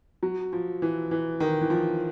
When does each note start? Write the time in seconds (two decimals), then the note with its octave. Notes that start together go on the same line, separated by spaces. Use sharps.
0.23 F#3
0.53 F3
0.82 E3
1.11 E3
1.40 D#3
1.61 E3
1.70 F3